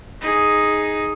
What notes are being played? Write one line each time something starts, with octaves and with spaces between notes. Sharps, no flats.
D#4 G#4